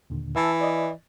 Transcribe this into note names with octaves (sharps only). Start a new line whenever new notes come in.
D#2 A#2 D3
E3 E5 A5 E6
D5 D#5